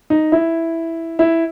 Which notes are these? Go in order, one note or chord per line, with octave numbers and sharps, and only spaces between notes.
D#4
E4
E4